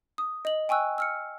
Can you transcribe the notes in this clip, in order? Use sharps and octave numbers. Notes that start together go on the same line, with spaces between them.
D#6
D#5 F#7
G5 G#5 C#6 E6 F#6
E6 F6 C#7